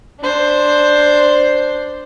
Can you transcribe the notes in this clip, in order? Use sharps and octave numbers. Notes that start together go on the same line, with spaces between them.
D4 C5